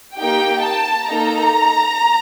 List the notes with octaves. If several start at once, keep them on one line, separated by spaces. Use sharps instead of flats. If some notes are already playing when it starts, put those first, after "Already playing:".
A#3 D#4 G4 G5
A5
A#3 D#4 A4 A#5